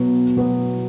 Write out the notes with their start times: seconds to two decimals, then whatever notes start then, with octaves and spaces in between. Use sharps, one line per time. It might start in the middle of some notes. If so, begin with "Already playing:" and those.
Already playing: B2 F#3 B3 F#4
0.36 B2 F#3 B3 F#4